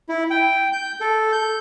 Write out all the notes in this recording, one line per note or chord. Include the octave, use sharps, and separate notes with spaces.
E4
G5
G6
A4
G6